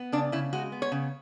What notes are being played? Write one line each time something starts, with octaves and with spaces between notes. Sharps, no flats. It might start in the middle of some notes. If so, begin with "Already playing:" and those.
Already playing: B3
C#3 D4
C#3 E4
G#3 F#4
B3
C#5
C#3